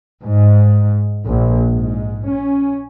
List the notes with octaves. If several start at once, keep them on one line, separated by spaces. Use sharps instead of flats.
G#2
A#1
G#2
C#4